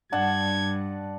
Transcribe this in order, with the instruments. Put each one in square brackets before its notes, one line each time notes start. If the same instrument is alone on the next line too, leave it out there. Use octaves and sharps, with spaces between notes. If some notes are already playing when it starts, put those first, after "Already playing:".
[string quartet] G2 [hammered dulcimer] D4 F#5 A5 [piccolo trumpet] G#6